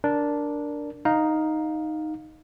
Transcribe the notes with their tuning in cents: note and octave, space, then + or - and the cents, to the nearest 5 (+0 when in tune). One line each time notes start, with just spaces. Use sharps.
D4 -5 A#4 +0
D#4 +0 F5 +15